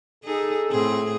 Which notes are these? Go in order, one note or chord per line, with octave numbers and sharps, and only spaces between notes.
D#4 G#4 A4
A2 C4 G#4